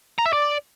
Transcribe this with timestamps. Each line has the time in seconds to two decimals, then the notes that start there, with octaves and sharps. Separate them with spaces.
0.19 A#5
0.26 E5
0.33 D5